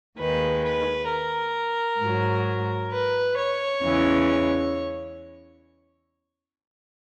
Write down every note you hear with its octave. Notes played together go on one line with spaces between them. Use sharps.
D#2 D#3 G#3 B4
B4
A#4
G#2 F#3
B4
C#5
E2 C#3 E3 G#3